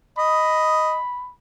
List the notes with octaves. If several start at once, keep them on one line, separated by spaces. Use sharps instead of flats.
D#5 B5